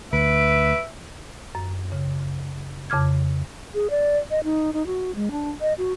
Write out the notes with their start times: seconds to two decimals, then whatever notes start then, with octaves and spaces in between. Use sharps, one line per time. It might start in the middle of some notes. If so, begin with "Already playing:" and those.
0.13 D2 B4 E5 D7
1.55 F#2
1.92 C#3
2.90 F2 C#3 D6 F6 G#6
3.74 G#4
3.90 D5
4.30 D#5
4.44 D#4
4.73 D#4
4.87 F#4
5.15 G#3
5.31 D4
5.61 D#5
5.78 F#4